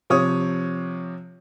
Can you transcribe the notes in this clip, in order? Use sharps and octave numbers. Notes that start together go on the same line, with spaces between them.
C3 F3 C#5 D#6